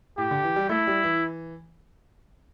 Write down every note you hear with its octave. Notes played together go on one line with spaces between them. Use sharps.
A2 G4
D3
E3
G3
A3 E4
G3
E3